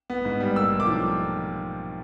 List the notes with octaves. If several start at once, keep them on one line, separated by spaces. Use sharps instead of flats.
B3
G#2
G3
A#3 E6
B1
D6
F3